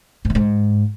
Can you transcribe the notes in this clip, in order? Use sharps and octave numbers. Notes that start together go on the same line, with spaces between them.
G#2
E3
G#2